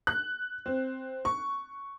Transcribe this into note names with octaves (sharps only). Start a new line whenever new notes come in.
F#6
C4
C#6